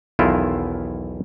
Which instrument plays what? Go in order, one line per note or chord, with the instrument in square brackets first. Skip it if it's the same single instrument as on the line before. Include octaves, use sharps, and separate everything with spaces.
[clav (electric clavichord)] B1 E2 D#3 E4 F4 A#4